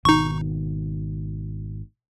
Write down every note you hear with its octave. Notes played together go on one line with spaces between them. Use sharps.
G#1 B2 D#3 D#4 C#6